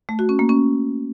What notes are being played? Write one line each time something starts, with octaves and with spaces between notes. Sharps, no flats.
A3
F#4
C#4
A#3
C#4